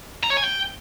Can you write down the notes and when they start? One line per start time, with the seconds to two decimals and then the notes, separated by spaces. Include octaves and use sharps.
0.24 A#5
0.31 C#5
0.37 G#5
0.44 G5